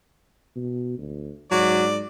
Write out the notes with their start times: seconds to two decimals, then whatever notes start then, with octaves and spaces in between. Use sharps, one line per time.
0.56 B2
0.98 D2
1.52 G#2 F#3 D5